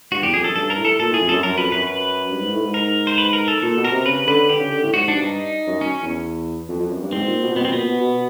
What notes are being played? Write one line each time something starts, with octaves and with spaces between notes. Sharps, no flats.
G2 F#4
E2 G4
F2 G#4
F#2 A4
G2 A4
A#4
A2
A4
A#2 A4
A2 G#4
F2
F#2 A4
F#2 A#4
F2 B4
F#2 B4
B4
G2
G#2
A2
G#2
A#4
C5
B4
A#4
A4
A#2 A4
B2
A#4
C3
C#3 B4
D3 B4
D3 G4
C#3
D3
A2
G#2 F#4
D4
G2
D#4
F#2
C#4
E2
F2
F2
F#2
G2
G#2 C4
A#2
B2
A#2
B2 B3
C4
A#2 B3
B2
B2